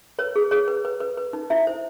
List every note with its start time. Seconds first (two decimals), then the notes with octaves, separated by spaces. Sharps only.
0.19 B4 C#5
0.36 G#4
0.51 G#4 C#5
0.68 B4
0.85 B4
1.00 B4
1.18 B4
1.33 D#4
1.50 E4 E5
1.67 C5